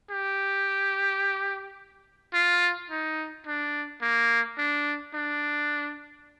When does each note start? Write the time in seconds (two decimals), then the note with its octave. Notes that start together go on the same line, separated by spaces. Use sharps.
0.11 G4
2.34 F4
2.90 D#4
3.47 D4
4.02 A#3
4.58 D4
5.14 D4